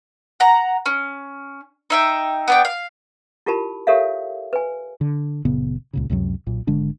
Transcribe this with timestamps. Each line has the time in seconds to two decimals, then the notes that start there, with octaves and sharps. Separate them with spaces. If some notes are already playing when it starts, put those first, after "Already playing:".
0.40 F#5 A#5
0.86 C#4
1.90 D#4 E5 G5
2.48 B3 D4 G5
2.65 F5
3.46 E4 F4 G4 A#4 A5 B5
3.87 G4 A4 A#4 C#5 E5 F5
4.53 B4 G#5
5.01 D3
5.45 F#1 A#2 C#3 B3
5.93 C#2 A#2 C#3
6.10 C#2 F#2 C3 F#3
6.46 B1 A#2
6.67 G#1 D3 G#3 D4